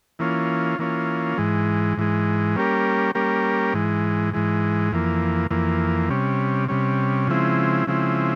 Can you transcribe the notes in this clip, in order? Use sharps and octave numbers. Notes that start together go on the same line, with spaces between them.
E3 A#3 C#4 F4
E3 A#3 C#4 F4
G#2 E3 G#3
G#2 E3 G#3
G3 A#3 C#4 G4 A#4
G3 A#3 C#4 G4 A#4
G#2 E3 G#3
G#2 E3 G#3
F2 E3 A#3
F2 E3 A#3
C3 G3 C#4
C3 G3 C#4
C#3 F3 G#3 C4 E4
C#3 F3 G#3 C4 E4